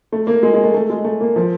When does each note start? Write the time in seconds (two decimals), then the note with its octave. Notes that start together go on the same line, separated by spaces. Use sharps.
0.12 A3
0.27 A#3
0.43 G#3
0.54 G#3
0.64 A3
0.74 A3
0.90 G#3
1.04 A3
1.20 A#3
1.36 F3